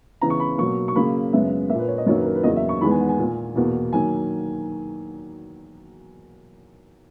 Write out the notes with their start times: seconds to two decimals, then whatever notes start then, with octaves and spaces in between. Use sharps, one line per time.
0.21 C#3 E3 B3 A#5
0.30 C#6
0.40 B5
0.58 B2 F#3 A#3 C#6
0.88 C#6
0.96 C#3 F#3 A#3 B5
1.32 F#2 C#3 G#3 B3 E5
1.69 A#3 E5
1.75 A#2 B4
1.88 C#5
1.98 D#5
2.06 F#2 D#3 F#3 A#3 C#5
2.16 B4
2.25 A#4
2.35 B4
2.43 E2 C#3 F#3 A#3 D#5
2.56 E5
2.69 C#6
2.81 E2 D#3 G#3 B3 B5
2.91 G#5
3.00 F#5
3.09 G#5
3.19 A#2 A#3
3.55 E2 B2 A#3
3.93 D#3 F#3 A#3 G#5